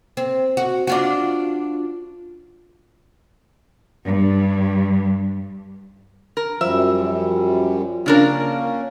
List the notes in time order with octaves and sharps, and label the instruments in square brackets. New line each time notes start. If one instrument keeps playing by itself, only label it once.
[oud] C4
F#4
D4 F4 F#4
[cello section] G2
[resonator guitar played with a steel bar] A#4
[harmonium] F#2 G3 [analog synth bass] F3 [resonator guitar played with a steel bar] E5
[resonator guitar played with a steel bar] C#3 D4 A#4 [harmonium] A#3 C#4